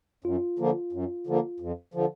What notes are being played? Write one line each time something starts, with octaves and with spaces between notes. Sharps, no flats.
F#2 F4
D3 F3 A#3
F#2
D3 F3 A#3
F2
D3 F3